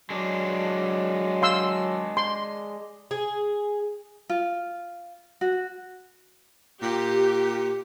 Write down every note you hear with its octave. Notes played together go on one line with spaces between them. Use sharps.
F#3 G#3 D4
F5 C6 E6
C6
G#4
F4
F#4
A#2 G4